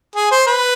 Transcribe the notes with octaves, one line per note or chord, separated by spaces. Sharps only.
G#4
C5
B4